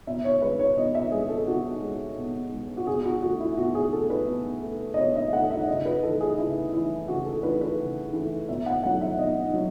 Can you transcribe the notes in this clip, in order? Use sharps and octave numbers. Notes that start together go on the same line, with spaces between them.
B2 E5
C#5
G#3 B4
C#5
B2 D#5
E5
G#3 G#4
A4
B2 F#4
G#3
B2
G#3
F#4
B2 G#4
F#4
A3 F#4
E4
B2 F#4
G#4
A3 A4
B4
B2
A3
D#5
B2 C#5
E5
A3 F#5
E5
C#3 D#5
B4
E3 A3 A4
G#4
C#3 E4
E3 A3 E4
C#3 F#4
A4
E3 A3 B4
B4
C#3
E3 A3
B2 E5
F#5
F#3 A3 F#5
E5
B2 D#5
F#3